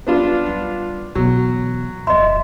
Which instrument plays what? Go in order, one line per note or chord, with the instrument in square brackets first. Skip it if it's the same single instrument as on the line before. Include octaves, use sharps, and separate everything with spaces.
[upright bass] G3 [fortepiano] B3 D4 F4
[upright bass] G3
[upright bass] B2 E3 [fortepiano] F#3
[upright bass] D#1 F2 [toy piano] D#5 C6 [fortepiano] E5